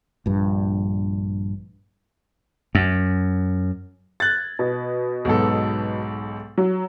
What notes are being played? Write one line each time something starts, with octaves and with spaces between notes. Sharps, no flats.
A#1 G2
F#2
F#6 G#6 A6
B2
B1 G#2 A4
F#3